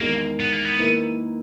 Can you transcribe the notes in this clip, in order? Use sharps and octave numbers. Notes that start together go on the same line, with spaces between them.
E2 D#3 G#3 A#3
B3
A#3
B3
D#3 A#3 E4 B4